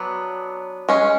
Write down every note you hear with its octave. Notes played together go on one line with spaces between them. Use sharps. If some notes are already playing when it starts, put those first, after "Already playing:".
Already playing: F#3 B3 D4
G#3 C#4